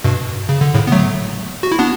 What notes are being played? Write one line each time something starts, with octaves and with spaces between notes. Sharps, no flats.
G2 B2
C#3
D3
A2 C#3
B3
F#3 A3
F#4
E4
B3 D4